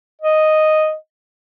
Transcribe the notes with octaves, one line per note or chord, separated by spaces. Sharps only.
D#5